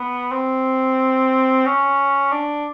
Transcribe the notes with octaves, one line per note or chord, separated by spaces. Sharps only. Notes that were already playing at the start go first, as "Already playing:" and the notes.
Already playing: B3
C4
C#4
D4